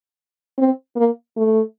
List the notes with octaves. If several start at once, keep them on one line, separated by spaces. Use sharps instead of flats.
C4
A#3
A3